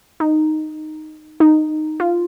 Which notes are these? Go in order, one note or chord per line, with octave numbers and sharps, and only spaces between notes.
D#4
D#4
F4